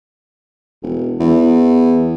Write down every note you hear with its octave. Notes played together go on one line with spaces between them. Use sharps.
E1
E2